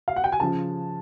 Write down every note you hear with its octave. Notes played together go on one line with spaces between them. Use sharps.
F5
F#5
G5
G#5
C#3 F3 A5